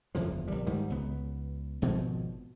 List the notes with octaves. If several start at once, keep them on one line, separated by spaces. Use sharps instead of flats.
F#1 E2 D3 F3
A#1 G3
G#2 D#3 G3
C#2 B3
G#1 B2 F3